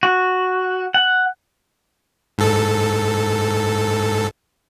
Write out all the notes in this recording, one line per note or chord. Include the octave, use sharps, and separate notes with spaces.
F#4
F#5
G#2 A4